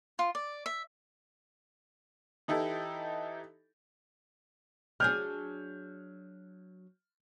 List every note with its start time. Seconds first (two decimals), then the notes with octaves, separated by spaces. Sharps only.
0.19 F4
0.35 D5
0.66 E5
2.48 E3 D#4 E4 G4 A4
5.00 F#3 D4 G#4 F6 G6